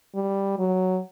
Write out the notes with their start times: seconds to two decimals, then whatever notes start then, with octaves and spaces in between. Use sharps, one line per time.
0.15 G3
0.59 F#3